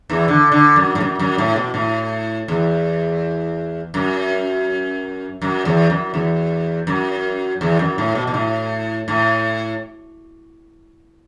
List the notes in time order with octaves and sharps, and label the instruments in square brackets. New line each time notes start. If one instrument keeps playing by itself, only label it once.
[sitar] E2 E3
D3
D3
F#2
A2
F#2
F#2
A2
B2
A2
E2
F#2
F#2
E2
F#2
E2
F#2
E2
F#2
A2
B2
B2
A2
A2